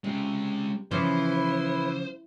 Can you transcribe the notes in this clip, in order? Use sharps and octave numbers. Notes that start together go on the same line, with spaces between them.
C3 G#3 C#4
C#3 E3 F3 E4 B4 C5